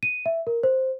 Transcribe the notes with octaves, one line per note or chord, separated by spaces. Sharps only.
D#7
E5
A#4
C5